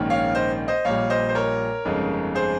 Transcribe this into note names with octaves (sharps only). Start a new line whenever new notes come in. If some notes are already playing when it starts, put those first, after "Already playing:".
Already playing: A#1 G#2 D#3 A#3 C#4
C#5 F5
C5 D#5
C5 D#5
A#1 A#2 G3 C#5 F5
C5 D#5
C5
A#4 C#5
G1 F2 C#3 G#3 D#4
G#4 C5